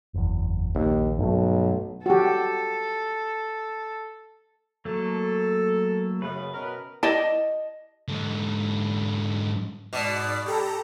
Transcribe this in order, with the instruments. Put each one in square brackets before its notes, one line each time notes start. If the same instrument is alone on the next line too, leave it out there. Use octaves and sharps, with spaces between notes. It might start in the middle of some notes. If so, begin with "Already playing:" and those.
[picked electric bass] F#1 E2
[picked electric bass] A#1 [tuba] D#2
[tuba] B1 [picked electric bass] G2 F#3 A3
[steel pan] F#4 G4 [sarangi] A4
[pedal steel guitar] F#3 A3 A#3 [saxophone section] A4
[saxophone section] F#2 C#3 [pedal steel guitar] B4
[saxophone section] B2 C#4 A#4
[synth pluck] E4 G4 D5 [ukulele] D#5 A5
[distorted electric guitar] G#2 D3
[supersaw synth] G#2 D5 C7 [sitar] B2
[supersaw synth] G4 A4 A#5